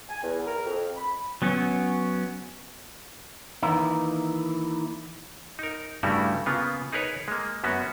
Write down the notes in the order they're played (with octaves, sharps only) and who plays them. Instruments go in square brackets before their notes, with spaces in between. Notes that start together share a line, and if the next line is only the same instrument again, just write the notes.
[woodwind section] G#5
E2
A#4
F2
B5
[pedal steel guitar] F#3 B3 C#4
[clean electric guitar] D#3 E3 A#3 D#4 E4
[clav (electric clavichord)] D#4 A#4
G2 C#3 G3 A3 E4 F#4
C#3 A#3 B3 F4
D#4 G#4 A#4 B4 C#5
G#3 A#3
F#2 B3 C#4 F#4